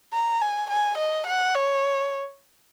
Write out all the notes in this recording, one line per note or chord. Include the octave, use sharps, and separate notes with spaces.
A#5
G#5
G#5
D#5
F#5
C#5